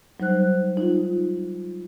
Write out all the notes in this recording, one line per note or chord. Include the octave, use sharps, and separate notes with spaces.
F#3 G3 D#4 C5 F#6
D#4 F4